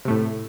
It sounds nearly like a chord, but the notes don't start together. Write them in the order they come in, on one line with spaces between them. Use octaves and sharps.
C3 A3 A2